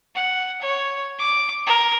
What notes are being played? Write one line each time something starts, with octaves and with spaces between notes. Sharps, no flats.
F#5
C#5
D6
A#4